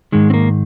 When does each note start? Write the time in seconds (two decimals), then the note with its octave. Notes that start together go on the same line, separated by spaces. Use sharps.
0.12 G#2 D#3 G#3
0.30 C4
0.34 A#3